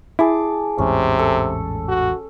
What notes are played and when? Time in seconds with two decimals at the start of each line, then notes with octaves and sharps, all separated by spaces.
0.19 E4 G#4 A5 D6
0.78 A1 E2 G#2 C3 C#4
1.19 A4
1.88 F#4